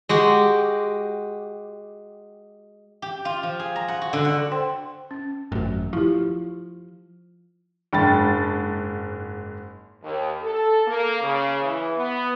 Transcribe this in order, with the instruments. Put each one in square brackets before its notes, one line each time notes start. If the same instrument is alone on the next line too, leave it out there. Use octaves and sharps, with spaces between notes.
[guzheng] G#3 F#4 G4
G4
F4
F3
G#4
A#5
F#5
F#4
D3
F#5
[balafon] C5 G5 C6
C#4
[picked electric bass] G#1 F#2 [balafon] A3 F#4
[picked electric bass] F3 [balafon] E4 G4
[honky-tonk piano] F#1 G#2 A6 [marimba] D4 G5 B5
[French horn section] D#2
A4
A#3
C#3
E3
B3